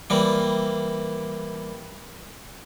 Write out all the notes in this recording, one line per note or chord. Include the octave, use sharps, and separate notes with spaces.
E3 G3 A#3